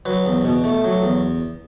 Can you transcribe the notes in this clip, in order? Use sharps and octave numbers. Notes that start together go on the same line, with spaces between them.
F#3 B4
E2
B2
A3
F#3
E2